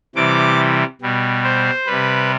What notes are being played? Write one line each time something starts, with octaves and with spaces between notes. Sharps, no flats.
C3 E3 G3 D6
B2 G3
C5
C3 G3 B4